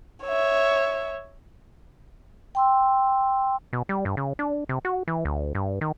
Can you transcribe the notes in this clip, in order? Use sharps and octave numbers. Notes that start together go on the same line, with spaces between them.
C#5 E5
G5 C6 E6
B2
G3
G2
C#3
D4
C3
F#4
E3
D2
G2
D#3